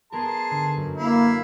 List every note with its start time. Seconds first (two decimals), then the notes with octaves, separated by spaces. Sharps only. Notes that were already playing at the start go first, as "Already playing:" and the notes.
0.12 B3 G#4 A#4 A5 C6
0.51 D3
0.76 F#2
0.97 A#3 E4 F5